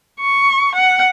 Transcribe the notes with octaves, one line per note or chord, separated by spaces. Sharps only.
C#6
F#5